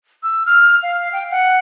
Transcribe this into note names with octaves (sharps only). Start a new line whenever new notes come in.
E6
F6
F5
G5
F#5